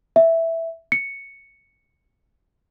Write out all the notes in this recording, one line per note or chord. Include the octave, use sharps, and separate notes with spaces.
E5
C#7